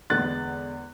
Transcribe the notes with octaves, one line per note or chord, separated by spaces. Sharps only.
E2 D3 G#3 B3 F#6 A6